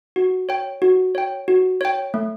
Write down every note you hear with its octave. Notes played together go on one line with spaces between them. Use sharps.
F#4
C#5 G5
F#4
C#5 G5
F#4
C#5 G5
A3